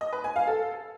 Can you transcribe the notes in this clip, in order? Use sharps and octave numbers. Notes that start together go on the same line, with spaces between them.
D#5
B4
G#5
F5
A4